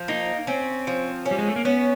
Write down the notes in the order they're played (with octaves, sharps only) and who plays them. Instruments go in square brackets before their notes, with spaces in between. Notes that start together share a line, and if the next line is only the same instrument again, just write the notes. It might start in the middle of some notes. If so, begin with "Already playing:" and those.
Already playing: [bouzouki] F3
[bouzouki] A#3 [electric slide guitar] D#4
[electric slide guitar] C4 [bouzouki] C#4
[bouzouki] F3
C#4
[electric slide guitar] G3
G#3
A3
A#3
[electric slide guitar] B3 [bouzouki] C#4